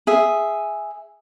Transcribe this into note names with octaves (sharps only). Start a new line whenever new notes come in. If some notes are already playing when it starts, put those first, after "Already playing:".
G#4 E5